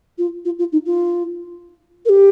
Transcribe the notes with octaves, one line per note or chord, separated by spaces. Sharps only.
F4
F4
F4
D#4
F4
A#4
G4